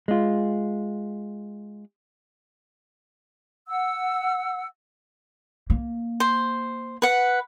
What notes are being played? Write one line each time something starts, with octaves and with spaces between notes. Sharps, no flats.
G#3 F4
F#5 E6
A#3
C5
B4 F#5